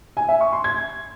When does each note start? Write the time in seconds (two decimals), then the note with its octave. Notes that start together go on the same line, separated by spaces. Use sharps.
0.17 G#5
0.29 E5
0.41 C#6
0.52 C6
0.64 G#6